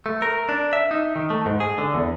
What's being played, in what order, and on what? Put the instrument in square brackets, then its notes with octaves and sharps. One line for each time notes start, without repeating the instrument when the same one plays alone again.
[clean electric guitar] A3
A#4
D4
E5
D#4
D#3
A3
G#2
G#4
D3
E2